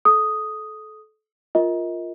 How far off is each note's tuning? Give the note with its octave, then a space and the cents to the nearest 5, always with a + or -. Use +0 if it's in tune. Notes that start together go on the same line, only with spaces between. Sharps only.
A4 -25 D#6 +0
F4 +0 A#4 +0 D#5 +35